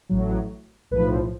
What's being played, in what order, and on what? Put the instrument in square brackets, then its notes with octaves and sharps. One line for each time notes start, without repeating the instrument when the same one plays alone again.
[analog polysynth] A1 A2 F#3
B1 A2 F3 B4